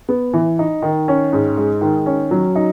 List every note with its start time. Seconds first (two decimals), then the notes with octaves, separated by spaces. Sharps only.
0.09 B3
0.33 E3
0.59 D#4
0.82 D#3
1.08 C#4
1.33 G#2
1.57 G#3
1.81 D#3
2.06 C#4
2.31 F#3
2.56 D#4